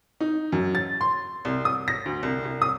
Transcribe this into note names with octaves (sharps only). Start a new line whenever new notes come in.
D#4
F#2
A6
C6
C2
D#6
A#6
D2
C2
C2
D#6